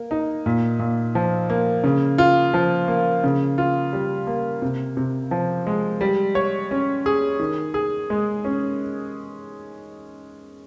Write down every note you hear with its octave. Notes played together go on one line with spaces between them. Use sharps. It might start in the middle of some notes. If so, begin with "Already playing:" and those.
Already playing: A#3
D#4
A#2
A#2
F3
A#3
C#3
F4
F3
A#3
C#3
F4
G3
A#3
C3
C3
F3
G#3
G3
C#5
C#4
G#4
D#3
G#4
G#3
C#4